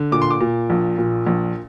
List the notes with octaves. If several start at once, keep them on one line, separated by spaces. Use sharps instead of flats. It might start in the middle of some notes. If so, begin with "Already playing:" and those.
Already playing: D3
A#2 D6
C6
D6
A#2
A#1
A#2
A#1